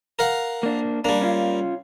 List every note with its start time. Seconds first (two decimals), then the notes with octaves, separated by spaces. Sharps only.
0.19 A#4 F5 F#5
0.63 A#3 D4
1.05 G3 A#3 D4
1.21 C#4 F4